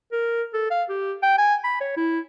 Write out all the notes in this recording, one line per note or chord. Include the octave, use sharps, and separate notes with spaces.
A#4
A4
F5
G4
G5
G#5
B5
C#5
E4